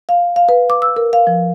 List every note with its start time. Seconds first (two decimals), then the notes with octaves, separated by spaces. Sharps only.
0.09 F5
0.36 F5
0.49 B4
0.70 D6
0.82 E6
0.96 A#4
1.13 F5
1.27 F3